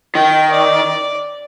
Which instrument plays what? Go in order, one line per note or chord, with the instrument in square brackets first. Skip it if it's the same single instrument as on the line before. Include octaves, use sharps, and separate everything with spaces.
[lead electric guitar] D#3 [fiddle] G5
[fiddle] D5